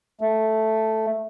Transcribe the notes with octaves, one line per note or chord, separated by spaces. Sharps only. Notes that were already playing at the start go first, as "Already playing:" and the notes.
A3